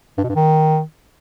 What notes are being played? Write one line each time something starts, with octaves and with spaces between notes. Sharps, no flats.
G2
B2
G2
D#3